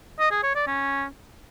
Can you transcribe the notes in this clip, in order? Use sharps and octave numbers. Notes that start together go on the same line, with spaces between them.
D#5
G#4
C#5
D5
C#4